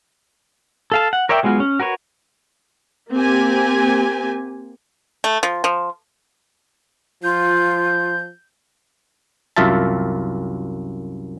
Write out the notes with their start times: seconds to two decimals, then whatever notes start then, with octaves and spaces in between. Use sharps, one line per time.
0.92 A4 F5 A5
1.13 F#5
1.29 A#4 C#5 D5 E5 G5
1.43 F#3 G#3 B3 F4 F#4
1.60 C#4
1.80 F#4 A#4 B4 C#5
3.13 A#3 C4 G4 G#5
5.24 A3
5.43 F3
5.64 F3
7.23 F3 F4 G6
9.57 C2 F#2 F4 E5 A5